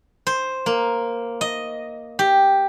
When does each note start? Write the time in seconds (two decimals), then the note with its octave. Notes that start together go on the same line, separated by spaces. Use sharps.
0.27 C5
0.66 A#3
1.41 D#5
2.19 G4